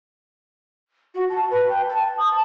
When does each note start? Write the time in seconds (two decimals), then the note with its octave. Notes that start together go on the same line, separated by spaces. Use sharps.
1.15 F#4
1.30 A5
1.51 B4
1.69 G5
1.90 A5
2.18 D#6
2.30 A5